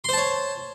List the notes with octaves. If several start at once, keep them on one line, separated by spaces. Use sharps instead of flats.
C5 C#5 A5 C6